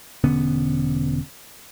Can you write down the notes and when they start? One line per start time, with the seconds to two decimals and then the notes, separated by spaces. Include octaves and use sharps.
0.24 E1 D3 B3 C#4